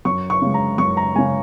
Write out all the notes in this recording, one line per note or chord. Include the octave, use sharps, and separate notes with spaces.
F#2 C#6
C#6
C#3 G#3
A#5
F#2 C#6
A#5
C#3 G#3 G#5